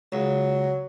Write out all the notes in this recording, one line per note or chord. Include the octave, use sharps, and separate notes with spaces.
C#2 F#3